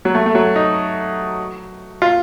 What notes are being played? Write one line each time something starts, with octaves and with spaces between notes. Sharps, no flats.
F#3
A3
A3
F#3
D#4
F4